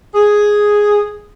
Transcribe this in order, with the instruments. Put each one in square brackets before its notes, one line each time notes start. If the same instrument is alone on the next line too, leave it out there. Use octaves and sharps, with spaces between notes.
[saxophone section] G#4